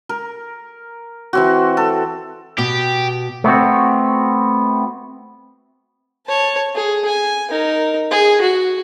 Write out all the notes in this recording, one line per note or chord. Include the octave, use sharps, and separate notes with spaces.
A#4
E3 C4 F#4
A4
B2 G4
A3 B3 C4 F#4
C#5 A5
G#4
G#5
D#4 A#4
G#4
F#4